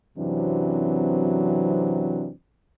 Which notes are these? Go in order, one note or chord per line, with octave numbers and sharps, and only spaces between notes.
F#2 C3 E3 F#3 C4 D4